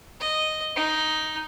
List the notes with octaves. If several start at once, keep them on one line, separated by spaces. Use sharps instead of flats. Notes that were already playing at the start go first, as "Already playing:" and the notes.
D#5
D#4